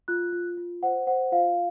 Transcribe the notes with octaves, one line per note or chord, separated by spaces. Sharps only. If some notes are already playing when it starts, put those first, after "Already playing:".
F4 F#6
F4
F4
C5 F#5
C5 F#5
F4 F5